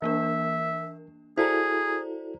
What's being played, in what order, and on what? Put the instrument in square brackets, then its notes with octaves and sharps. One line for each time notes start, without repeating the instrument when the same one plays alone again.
[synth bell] E3 A#3 D4 [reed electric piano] A#4 [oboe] E5
[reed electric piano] E4 F#4 A4 [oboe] G#4 [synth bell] C5 D5 A#5